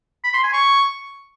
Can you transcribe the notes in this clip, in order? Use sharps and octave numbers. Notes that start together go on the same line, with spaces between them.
B5
C6
G#5
C#6